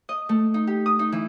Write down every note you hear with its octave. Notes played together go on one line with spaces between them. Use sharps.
D#5
A3
D#4
G4
D#6
D#4
E3